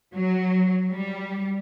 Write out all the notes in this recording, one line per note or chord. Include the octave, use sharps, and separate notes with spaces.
F#3
G3